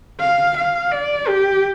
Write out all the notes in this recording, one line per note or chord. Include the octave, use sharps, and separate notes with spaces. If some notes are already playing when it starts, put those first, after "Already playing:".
F5
F5
D5
G4